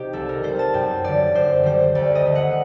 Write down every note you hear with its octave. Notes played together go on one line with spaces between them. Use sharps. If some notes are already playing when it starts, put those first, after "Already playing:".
Already playing: C3 D#4 G4
C2 A4
A#4
C3 G3 C5
A5
F#2 G5
D3 G3 D5
F#2 C5
D3 G3 C5
D2 D5
D#5
D3 A3 D#5
F#5